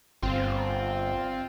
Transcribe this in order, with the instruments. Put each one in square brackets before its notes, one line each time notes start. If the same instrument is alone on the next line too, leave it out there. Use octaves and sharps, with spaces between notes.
[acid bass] G1 [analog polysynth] C4 F4